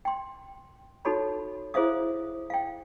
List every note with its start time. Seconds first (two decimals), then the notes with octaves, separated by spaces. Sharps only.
0.05 G5 C6
1.05 D#4 F#4 A4 C#5 B5
1.74 E4 G#4 C5 E5 F5 D#6
2.50 F5 G5